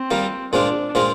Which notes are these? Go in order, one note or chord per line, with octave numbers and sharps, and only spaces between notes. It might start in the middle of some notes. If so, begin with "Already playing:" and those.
Already playing: C4
G3 A#3 F4
A#2 G#3 C4 D4 F4
A#2 G#3 C4 F4